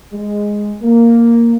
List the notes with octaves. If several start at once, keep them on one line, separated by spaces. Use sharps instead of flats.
G#3
A#3